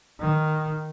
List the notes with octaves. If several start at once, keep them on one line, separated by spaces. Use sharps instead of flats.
D#3